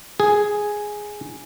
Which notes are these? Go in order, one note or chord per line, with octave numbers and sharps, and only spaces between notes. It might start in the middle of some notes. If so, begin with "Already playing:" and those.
G#4